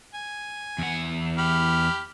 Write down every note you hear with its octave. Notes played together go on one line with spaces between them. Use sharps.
G#5
E2 F#5
G4 B5 F6